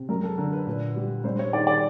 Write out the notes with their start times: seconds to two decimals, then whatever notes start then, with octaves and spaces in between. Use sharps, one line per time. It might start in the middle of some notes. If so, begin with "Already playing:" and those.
Already playing: C3
0.09 F#2 A#4
0.24 A4
0.38 D3 A#4
0.53 B4
0.67 A#2 B4
0.96 G3
1.24 G2 C5
1.39 C#5
1.53 D#3 D5
1.67 D5